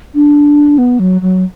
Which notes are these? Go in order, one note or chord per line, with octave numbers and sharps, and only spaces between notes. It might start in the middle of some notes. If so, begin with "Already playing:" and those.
D4
B3
F#3
F#3